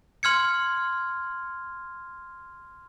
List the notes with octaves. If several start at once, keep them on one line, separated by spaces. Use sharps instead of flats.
C6 F6 G#6 C#7